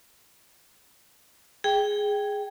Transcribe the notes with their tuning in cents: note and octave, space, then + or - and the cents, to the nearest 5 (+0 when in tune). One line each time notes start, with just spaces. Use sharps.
G#4 +0 G5 +0